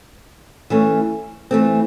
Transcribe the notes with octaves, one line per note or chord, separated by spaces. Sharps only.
E3 A3 C#4
E3 A3 C4